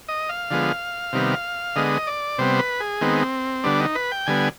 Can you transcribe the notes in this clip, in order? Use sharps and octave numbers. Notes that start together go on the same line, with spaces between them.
D#5
F5
D3 F3 G#3 B3
C3 D#3 G3 B3
D3 G#3 B3 D#5
D5
C3 G3 B3 C5
B4
G#4
D#3 G#3 B3 C4
D3 G3 B3 D4
D#4
B4
G5
D3 G3 B3 G#5